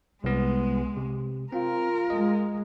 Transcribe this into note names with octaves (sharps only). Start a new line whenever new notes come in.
C2 G#3 B3
C3
C4 F4 A#4
G#3 D#5